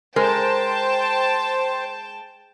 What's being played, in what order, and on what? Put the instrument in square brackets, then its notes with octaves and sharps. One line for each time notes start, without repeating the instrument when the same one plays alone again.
[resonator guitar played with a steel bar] G#3 A#4 [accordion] C5 [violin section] G5 A5